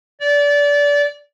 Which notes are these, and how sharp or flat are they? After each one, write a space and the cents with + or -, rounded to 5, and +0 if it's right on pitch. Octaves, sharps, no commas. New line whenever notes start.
D5 -25